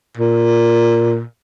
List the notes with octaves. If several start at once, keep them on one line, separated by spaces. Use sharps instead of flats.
A#2